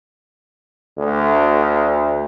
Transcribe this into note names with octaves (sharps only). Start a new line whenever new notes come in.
D2